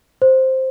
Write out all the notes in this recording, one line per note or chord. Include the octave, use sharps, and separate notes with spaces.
C5